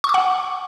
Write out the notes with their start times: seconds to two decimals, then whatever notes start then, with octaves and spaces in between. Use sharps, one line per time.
0.04 C#6
0.09 D6
0.14 F#5